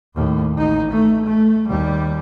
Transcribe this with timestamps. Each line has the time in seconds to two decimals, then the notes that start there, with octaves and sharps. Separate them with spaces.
0.15 D#2 A2
0.57 A1 D#4
0.92 A3
1.27 A3
1.68 D#2 G3